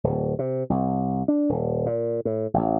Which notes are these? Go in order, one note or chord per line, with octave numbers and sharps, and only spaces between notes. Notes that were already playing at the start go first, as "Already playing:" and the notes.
D1
C3
C2
D4
D#1
A#2
A2
A1